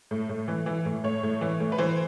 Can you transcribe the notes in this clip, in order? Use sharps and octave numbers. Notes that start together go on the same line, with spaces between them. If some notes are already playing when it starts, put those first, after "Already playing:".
A2
A2
E3
E3
A2
A2 C#5
A2
E3
A2
B4
E3 C5